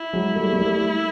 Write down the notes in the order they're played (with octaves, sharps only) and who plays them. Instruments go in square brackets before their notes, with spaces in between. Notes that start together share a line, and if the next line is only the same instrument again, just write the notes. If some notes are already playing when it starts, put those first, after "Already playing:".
Already playing: [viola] E4
[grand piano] F#3 G#3
G3 A3
A#3
G3 A3